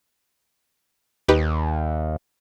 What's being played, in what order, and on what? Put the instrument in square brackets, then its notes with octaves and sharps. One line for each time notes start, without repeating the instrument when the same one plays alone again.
[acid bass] D#2 [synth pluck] D#4 G4 B4